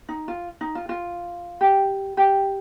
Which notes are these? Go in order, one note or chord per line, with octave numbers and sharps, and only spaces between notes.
D#4
F4
D#4
F4
F4
G4
G4